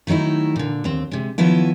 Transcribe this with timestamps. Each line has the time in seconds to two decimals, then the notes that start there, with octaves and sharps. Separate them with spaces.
0.07 D#3 F#3 A3 D#4 E4
0.56 A#2 D3
0.84 D#2 C4
1.11 C3 G#3
1.38 D#3 F3 F#3 B3 E4